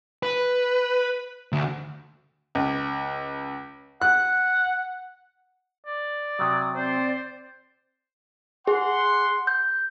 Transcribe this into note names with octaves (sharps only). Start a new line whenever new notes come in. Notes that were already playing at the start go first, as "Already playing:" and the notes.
B4
D2
C#2
F#5 F#6
D5
C3 F#3 D#6
C4 C5 D5
G#4 F#5 C6
G6